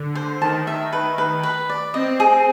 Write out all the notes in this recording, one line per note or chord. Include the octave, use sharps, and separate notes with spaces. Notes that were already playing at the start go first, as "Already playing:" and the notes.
Already playing: D3
C5
D#3 A5
E5
B4
B4
B4
D5
C4 D#5
G#4